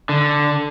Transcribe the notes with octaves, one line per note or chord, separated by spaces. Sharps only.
D3